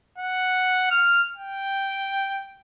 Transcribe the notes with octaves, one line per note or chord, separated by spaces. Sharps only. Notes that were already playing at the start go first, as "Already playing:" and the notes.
F#5
F6
G5